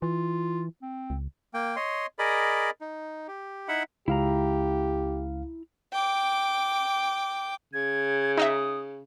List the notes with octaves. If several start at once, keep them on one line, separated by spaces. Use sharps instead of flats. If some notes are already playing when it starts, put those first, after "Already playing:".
E3 F4
C4
C#2
A#3 G5
C#5 D#5 C6
G#4 A#4 D5 D#5 B5
D#4
G4
D#4 E4 E5 F#5 B5
C#2 E4 G4 F5 A#5
G5 D6
C#3 G#6
D#4 D#5 E5 D#6